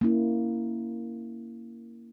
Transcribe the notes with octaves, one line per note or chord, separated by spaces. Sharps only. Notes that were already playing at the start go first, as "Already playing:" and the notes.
A#3 C#4 E4